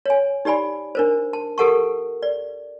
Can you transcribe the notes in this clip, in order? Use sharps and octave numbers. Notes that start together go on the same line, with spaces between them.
C#5 G#5
D#4 G4 D5 G#5 B5
D4 A#4 C5
A5
G4 A4 A#4 F#5 A5 C#6
D5